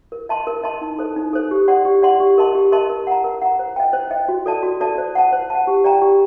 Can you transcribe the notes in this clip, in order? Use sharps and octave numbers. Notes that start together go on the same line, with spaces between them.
A#4
D#5 A5 C6
A#4
D#5 A5 C6
D#4
A4 C5
D#4
A4 C5
G4
D5 F#5 C6
G4
D5 F#5 C6
G4
A#4 D#5 A5 C6
G4
A#4 D#5 A5 C6
A#4
F#5 A#5
A#4
F#5 A#5
C5
D#5 G5
C5
D#5 G5
F#4
A4 D5 A5
F#4
A4 D5 A5
C5
F#5 A5
C5
F#5 A5
G4
D5 G5 A#5
G4